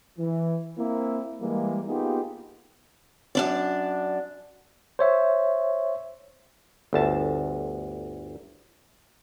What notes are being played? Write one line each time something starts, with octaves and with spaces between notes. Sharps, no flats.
E3
A#3 C4 E4
E3 G3 G#3 A#3
A#3 B3 D#4 F4 G4 G#4
F#2 D4 D5
C5 C#5 E5
G1 D2 A5